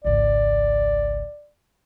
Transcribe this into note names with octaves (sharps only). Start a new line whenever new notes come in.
G#1 C#2 D5